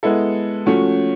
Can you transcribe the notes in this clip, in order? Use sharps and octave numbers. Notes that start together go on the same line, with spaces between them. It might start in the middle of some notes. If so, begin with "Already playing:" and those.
G#3 B3 E4 A4
F3 A3 C#4 F#4